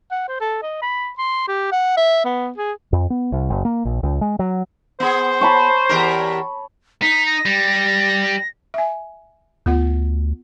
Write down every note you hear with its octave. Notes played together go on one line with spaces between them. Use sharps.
F#5
C5
A4
D#5
B5
C6
G4
F#5
E5
B3
G#4
F2
B3
C2
F#1
A#3
A#1
C#2
G#3
F#3
B3 G#4 C5
C#5 A5 B5
E2 G4 A#4
D#4 B6
A#6
G3
E5 G#5
D2 B3 F4 F#5